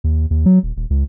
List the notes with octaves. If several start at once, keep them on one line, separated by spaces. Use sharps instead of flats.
D#2
D#2
F#3
D#1
D#1
C#2